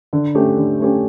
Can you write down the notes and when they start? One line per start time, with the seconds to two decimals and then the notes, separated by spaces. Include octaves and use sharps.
0.13 D3
0.35 A3 C#4 G4
0.58 D3
0.80 A3 C#4 G4